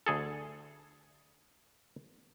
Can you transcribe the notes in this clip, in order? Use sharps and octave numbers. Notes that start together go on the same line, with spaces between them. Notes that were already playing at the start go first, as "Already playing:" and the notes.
D2 G#4 A4